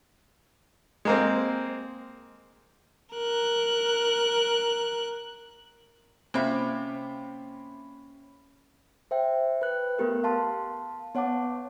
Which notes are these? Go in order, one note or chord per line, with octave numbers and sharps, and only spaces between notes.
G#3 A#3 C4
A#4 F#6
C3 A#3 C4 C#4 F4 E5 B5
C5 E5 G5
B4 F#6
A3 B3 G4 A#4
F5 A5 C6
B3 C#5 F#5 A5 D6